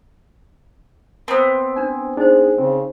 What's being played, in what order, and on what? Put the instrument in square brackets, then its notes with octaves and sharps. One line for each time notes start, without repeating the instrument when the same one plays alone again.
[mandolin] B3 C4 [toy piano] C5 A5
[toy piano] C#4 D4 [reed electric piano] G#5
[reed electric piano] D4 [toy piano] D#4 C5 [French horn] G#4
[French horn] C#3 [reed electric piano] C4